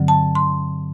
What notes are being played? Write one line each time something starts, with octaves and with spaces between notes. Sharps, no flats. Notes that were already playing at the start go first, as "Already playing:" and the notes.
Already playing: G2 D3 F#3 C4
A5
C6